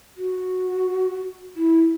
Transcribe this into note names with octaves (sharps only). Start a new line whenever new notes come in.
F#4
E4